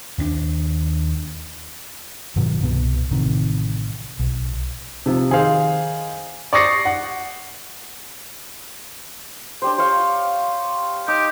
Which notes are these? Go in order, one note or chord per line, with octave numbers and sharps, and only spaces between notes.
D#2 C4 D4
G2 B2 D#3 F#3
C2 B2 B3
A1 C3 D#3
B1
C3 F3
D#3 G#4 C5 F5
D5 C#6 D#6 A#6 C7 C#7
F#5
D4 G4 C5
C5 C#5 F5
D#4 G4